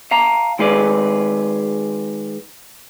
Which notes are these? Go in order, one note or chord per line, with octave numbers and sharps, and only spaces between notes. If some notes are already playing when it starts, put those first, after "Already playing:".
F5 A5 A#5
D#3 G#3 G#4 B4 D5